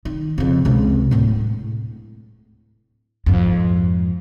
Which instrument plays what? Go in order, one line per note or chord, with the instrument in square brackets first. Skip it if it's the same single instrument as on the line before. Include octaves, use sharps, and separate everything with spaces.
[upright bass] D#3
F2 C#3
C#2 C3
D1 A2
F2 G#2